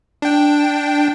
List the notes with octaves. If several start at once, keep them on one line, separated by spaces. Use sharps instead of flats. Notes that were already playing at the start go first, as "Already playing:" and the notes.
D4 G5